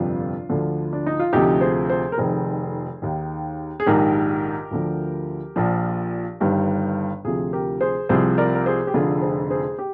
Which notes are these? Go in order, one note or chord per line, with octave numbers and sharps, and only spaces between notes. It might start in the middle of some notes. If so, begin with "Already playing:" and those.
Already playing: G1 F2 C3 F3 D4 F4
D2 D3 F3
D4
D#4
F4
D2 C3 F3 D#4 G4
G#4 C5
G#4 C5
A#4
F1 F2 D#3 G#4 C5
D#2 D#3
G#4
A#1 G#2 D#3 G4 A#4
D2 D3 F3
A#1 A#2 F3
G1 G2 D#3
D2 C3 F3 F4 G#4
G4 A#4
G#4 C5
C2 C3 F3 G#4 C5
A#4 D5
A#4
G#4 C5
G4
F1 F2 D3 F4 G#4
G#4 C5
G#4 C5
G4